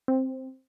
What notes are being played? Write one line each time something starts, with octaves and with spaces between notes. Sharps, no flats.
C4